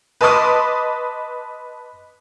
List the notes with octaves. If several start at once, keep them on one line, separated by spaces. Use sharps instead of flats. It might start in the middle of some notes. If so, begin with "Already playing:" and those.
B4 D#5 A5 C6 D6 D#6